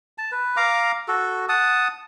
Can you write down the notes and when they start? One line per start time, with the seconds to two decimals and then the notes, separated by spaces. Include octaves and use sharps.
0.18 A5
0.32 B4
0.57 F5 A#5 D6
1.08 F#4 A4
1.49 F#5 A5 D#6